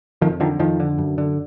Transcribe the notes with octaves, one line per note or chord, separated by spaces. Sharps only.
F2 D#3 F3
D3 D#3 F3
F2 D#3 F3
D3
F#2
D3